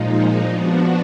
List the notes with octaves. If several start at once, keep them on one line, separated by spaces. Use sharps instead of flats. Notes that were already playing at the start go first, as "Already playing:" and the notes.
Already playing: A#2 F3 G#3 D#4
F3 B3 D4 F#4